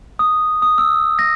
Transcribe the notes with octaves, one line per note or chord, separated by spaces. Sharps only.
D#6
D#6
E6
A#6